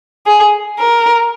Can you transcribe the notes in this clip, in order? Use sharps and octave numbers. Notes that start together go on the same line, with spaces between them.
G#4
A#4